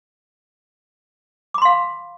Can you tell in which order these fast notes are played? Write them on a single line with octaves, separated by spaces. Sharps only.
D6 B5 C6 F5